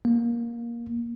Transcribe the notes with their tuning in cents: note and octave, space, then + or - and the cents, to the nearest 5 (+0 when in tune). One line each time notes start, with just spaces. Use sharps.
A#3 +15